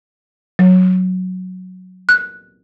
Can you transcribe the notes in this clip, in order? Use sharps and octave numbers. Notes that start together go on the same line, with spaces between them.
F#3
F#6